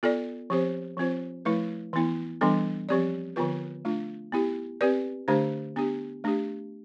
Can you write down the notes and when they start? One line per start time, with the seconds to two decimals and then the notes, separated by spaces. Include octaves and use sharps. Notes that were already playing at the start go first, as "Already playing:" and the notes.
0.03 B3 F4 A4 D5
0.50 F3 C4 G4 C5
0.97 F3 C4 F4 C5
1.45 F3 A3 E4 B4
1.93 E3 B3 E4
2.41 E3 G3 B3 D4 A4
2.89 F3 C4 G4 D5
3.36 D3 F3 B3 F4 B4
3.85 A3 D4 F4
4.32 B3 E4 G4
4.81 C4 G4 B4 D5
5.28 D3 A3 D4 G4 C5
5.76 B3 D4 G4
6.24 A3 D4 G4